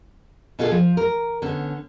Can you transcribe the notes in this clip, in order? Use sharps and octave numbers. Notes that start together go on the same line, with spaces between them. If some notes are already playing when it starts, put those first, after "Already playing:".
B2 B3 F4 G#4 A4
F3
A#4
D3 B3 C#4